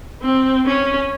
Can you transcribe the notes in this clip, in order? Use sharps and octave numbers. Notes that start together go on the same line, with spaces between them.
C4
C#4